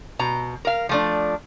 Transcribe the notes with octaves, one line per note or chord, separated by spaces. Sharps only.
B2 A#5
A#4 F5
F3 A3 D4